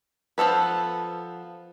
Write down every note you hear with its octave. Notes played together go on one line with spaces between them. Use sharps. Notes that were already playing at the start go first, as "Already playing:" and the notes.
F3 B3 A4 B4